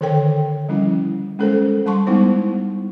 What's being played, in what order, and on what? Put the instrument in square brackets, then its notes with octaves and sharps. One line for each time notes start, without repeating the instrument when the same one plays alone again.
[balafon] D3 D#3 A4 A#4 C#5 G5
F3 G3 C#4 E4
G#3 C#4 A4 A#4 C5
G3 A5 C6 C#6
G3 G#3 B3 D#4 E4 C5